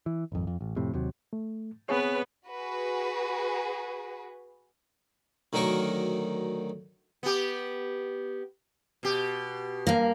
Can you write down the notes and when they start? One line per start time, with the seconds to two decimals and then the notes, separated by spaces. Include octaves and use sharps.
0.06 E3
0.32 G#1 F2
0.47 F2
0.61 A1
0.76 F2 A2 C3
0.94 D#2 C3 F#3
1.33 A3
1.89 B3 C4 G#4 B4 C#5
2.46 F#4 G#4 B4
5.53 D2 D#3 F#3 D#4 A#4 C#6
7.23 B3 G4
9.03 B2 G4
9.87 G2 A#3